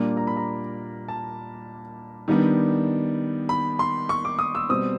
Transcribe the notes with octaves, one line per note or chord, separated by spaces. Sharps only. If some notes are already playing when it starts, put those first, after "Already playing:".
Already playing: A#2 G3 A#3 D4
A#5
B5
A#5
A5
D#3 G3 B3 D4
B5
C6
C#6
D6
D#6
E6
B2 G3 C4 D#6